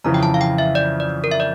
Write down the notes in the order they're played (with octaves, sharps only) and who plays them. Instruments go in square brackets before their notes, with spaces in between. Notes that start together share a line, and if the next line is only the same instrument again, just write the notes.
[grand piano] F2 C#3 E3 [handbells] A#5
[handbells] G5
A5
F5
G5
E5
D5
D5
A#4
E5
D5